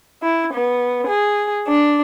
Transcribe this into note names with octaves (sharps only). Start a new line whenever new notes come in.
E4
B3
G#4
D4